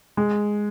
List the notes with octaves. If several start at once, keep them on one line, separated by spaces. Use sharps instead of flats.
G#3